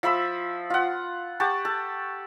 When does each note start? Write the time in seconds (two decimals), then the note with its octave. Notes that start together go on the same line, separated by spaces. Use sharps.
0.03 F3 E5 B5 E6
0.70 F4 F#5
1.40 G4 F#5 A5 C#6
1.65 A4